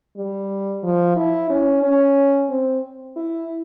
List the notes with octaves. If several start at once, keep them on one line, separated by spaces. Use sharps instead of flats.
G3
F3
E4
C#4
C#4
C4
E4